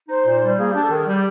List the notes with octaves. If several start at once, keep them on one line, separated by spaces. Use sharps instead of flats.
D#4 C5
A#2
G3
A#3 G#4
D4 G4
A4
D#3
G#4
G3 G4